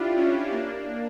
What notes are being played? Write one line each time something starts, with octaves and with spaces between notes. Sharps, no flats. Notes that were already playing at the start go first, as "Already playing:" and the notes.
Already playing: D4 E4 F4 G4
C#4 E4
A#3 D4